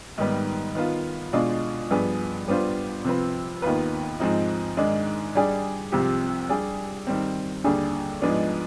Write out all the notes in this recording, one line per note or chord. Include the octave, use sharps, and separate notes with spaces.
G#2 D#3 G3 B3
D#3 B3 F4
B2 G#3 D4 F4
G2 F3 B3 D4 G#4
G3 B3 D4 F4 C5
C3 F3 C4 F4 B4
D#2 D#3 B3 F4 B4
G#2 F3 G#3 C4 D#4
G#2 D#3 G#3 D4
G3 D4 G#4 D5
C2 C3 F3 C4 G4
G3 D4 G#4 D5
D#3 G3 C4
D#2 D3 G3 D4 G#4
G#2 F3 G#3 B3 D4